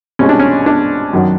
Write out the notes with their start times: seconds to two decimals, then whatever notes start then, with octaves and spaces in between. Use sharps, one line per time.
0.19 C2 B2 G#3 C#4
0.29 D4
0.39 C#4
0.66 D4
1.13 F#2 D#3 F#3